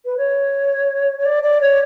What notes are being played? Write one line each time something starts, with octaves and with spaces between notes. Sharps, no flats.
B4
C#5
C#5
D5
D5
C#5